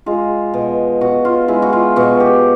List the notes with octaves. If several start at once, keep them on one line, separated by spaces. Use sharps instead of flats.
G#3 F4
B2
B2 F#4
F4
G#3 E4
F#4
F4
B2 F#4
G4